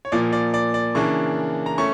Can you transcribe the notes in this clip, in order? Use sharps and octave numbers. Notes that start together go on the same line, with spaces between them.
C#5
A#2 F3 A#3 D5
D5
D5
D5
C#3 E3 A#3 D4 C#6
A#5
A3 C#4 C#6